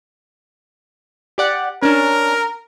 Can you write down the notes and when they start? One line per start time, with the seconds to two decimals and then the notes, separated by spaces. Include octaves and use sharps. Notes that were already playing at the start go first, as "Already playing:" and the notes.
1.38 G4 D5 F#5
1.82 C#4 D4 A#4